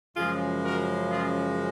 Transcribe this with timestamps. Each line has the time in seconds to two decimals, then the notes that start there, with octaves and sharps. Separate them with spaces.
0.16 F#2 C#3 F3 G#3 F4 G#4
0.63 F#4 A#4
1.10 F4 G#4